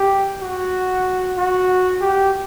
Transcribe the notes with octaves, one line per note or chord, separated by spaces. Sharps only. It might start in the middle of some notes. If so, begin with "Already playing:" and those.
Already playing: G4
F#4
F#4
G4